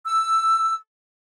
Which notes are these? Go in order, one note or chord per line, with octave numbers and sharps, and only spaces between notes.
E6